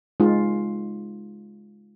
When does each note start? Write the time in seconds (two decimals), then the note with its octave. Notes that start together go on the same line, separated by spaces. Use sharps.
0.20 G#3 D#4 F4